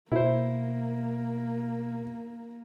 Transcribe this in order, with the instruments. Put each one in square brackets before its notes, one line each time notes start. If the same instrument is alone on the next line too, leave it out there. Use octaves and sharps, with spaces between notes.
[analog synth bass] B2 [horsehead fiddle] A#3 [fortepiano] E4 C5